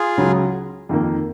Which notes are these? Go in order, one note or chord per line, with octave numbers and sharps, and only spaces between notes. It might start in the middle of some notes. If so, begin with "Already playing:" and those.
Already playing: F4 G#4
C#2 C#3 F#3
F2 D#3 A#3